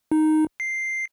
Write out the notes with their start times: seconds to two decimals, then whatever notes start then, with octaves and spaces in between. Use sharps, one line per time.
0.12 D#4
0.60 C7